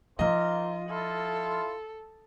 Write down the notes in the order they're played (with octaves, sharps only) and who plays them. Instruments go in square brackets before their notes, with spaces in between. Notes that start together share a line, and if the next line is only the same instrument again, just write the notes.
[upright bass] F3 D#4 [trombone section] A#3 C4 A#4 [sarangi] F4 [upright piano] D#5
[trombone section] E4 F4 [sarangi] A4